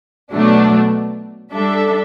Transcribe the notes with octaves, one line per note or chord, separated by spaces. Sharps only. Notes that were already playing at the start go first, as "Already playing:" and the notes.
B2 F#3 A3 D4
G3 D4 A4 E5